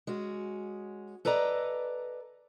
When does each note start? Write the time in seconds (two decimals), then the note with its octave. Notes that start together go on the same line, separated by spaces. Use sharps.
0.07 G#3 C#4 F#4
1.25 A4 B4 D5 D#5 A#5